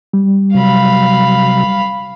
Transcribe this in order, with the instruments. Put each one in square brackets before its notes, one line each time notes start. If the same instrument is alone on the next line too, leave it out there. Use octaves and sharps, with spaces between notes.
[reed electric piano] G3
[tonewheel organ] C3 F#3 [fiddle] F5 B5